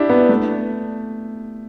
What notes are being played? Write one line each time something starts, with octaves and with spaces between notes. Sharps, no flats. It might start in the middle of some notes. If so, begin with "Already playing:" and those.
Already playing: D4 E4 G4
B3
A3